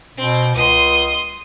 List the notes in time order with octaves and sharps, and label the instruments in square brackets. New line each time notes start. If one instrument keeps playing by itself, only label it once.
[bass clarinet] B2 [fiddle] C4
[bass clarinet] C#2 [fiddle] C6 D#6